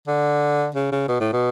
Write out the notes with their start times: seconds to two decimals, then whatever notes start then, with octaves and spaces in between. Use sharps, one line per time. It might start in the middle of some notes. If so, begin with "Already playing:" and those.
0.07 D3
0.75 C#3
0.92 C#3
1.08 B2
1.21 A2
1.33 B2